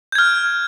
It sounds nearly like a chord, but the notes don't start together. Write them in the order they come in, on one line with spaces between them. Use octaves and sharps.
G6 G#6 F6